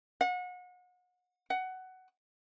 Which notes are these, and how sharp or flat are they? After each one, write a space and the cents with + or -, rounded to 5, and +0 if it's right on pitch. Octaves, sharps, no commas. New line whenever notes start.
F#5 -35
F#5 +15